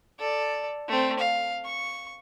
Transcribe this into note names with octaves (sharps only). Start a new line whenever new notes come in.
A4 D5
A3 C4
F5
C#6